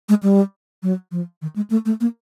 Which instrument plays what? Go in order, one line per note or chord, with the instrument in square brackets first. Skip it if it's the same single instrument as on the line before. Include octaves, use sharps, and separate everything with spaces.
[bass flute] G#3
G3
F#3
F3
D#3
G#3
A3
A3
A#3